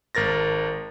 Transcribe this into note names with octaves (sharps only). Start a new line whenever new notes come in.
G#1 A#4 A6 A#6